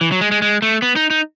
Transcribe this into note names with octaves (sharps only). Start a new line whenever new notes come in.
E3
F#3
G#3
G#3
G#3
A3
B3
D#4
D#4